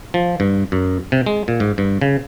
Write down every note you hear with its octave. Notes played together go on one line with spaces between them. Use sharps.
F3
G2
F#2
C3
G#3
A#2
G#2
G2
C#3